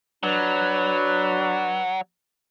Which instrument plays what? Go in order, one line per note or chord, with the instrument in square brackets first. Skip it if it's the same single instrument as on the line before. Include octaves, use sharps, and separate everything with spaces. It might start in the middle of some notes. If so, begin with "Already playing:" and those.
[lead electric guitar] F#3 [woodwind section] D4 B4